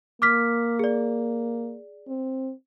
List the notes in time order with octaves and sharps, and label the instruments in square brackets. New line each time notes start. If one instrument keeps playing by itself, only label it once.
[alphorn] A#3 [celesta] D6 F6 B6
[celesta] G#4 D5
[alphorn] C4